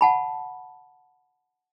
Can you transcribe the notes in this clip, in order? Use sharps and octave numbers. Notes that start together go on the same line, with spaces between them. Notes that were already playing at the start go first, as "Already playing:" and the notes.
F#5 A5 B5